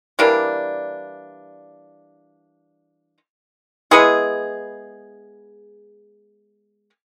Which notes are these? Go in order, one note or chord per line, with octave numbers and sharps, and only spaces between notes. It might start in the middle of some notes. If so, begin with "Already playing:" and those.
E3 G3 A#3 D4
G#3 B3 E4 G#4